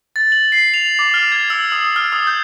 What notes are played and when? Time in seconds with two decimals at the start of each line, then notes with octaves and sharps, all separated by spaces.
0.16 A6
0.32 F#7
0.52 C7
0.74 F7
0.99 D6
1.14 F6
1.32 G#6
1.50 E6
1.72 D#6
1.96 F6
2.12 D#6
2.27 G6